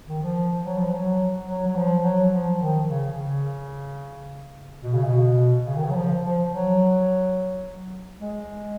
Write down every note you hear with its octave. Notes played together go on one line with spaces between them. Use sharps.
D#3
F3
F#3
F3
F#3
F#3
F#3
F3
F#3
F3
D#3
C#3
C#3
B2
C#3
B2
C#3
D#3
C#3
F#3
F3
F3
F#3
G#3